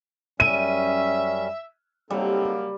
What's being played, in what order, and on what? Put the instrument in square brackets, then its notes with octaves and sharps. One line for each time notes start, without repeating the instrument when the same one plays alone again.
[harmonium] F#2 G3 C#4 [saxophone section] E5 [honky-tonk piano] D#7
[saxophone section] C#3 F#3 A#3 [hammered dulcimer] G3 [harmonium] C4 D#4 A4